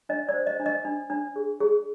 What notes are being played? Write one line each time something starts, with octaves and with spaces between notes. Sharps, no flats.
D4 D#5
D5
C5
D#5
D4
D#5
D4
D4
G#4
G#4